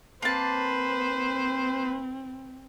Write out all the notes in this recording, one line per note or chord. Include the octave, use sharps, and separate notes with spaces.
A#3 C4 B4 C5 A5